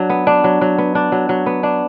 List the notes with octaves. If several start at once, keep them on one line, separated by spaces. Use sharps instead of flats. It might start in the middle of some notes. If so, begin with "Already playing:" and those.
Already playing: F#3 D4
B3
D4
F#3
F#3
B3
D4
F#3
F#3
B3
D4